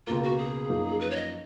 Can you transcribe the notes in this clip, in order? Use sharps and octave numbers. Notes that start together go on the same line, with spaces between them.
C#2 B2 A#3 F4
F#4
G#4
F#2 F3 A#3 D#4
B4
C#5
D#5